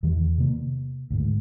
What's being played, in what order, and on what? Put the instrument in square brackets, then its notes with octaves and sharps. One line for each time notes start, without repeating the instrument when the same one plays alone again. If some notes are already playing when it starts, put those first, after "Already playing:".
[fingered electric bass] E2 D#3
C3 A#3
D2 G#2